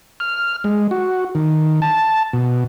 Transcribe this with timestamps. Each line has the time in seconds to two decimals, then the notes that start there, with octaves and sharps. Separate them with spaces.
0.20 F6
0.64 G#3
0.91 F#4
1.35 D#3
1.82 A5
2.33 B2